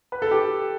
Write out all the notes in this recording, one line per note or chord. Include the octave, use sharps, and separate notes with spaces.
B4
A4
G4